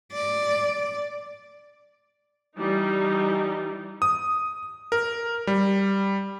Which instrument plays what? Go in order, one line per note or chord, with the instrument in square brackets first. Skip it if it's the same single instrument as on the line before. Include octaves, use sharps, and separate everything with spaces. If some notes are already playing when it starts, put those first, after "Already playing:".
[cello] D5
[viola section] E3 G3 D#4
[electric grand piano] D#6
A#4
G3